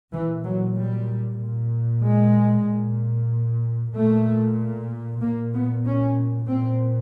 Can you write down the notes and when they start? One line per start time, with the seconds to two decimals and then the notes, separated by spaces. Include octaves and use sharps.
0.13 A#2 E3
0.45 F#3
0.77 G3
1.40 A#2
2.03 G#3
2.67 A#2
3.94 A#2 A3
5.22 A#2 A#3
5.53 B3
5.85 C#4
6.48 A#2 C4